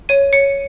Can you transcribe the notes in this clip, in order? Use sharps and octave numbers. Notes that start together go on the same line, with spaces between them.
C#5 D#7
C#5 C#7